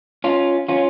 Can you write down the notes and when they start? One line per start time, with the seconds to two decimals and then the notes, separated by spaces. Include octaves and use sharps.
0.24 C#4 F4
0.69 C#4 F4